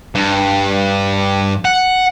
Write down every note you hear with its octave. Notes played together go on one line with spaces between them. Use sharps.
G2
F#5